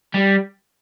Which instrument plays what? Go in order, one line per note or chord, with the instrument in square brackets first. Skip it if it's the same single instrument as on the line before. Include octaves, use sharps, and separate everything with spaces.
[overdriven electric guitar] G3